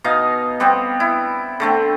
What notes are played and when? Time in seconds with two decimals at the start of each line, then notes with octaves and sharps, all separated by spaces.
0.04 B2 D#4 D#5 F5
0.60 G3 B3 C4
1.00 E4
1.60 D3 A3 C4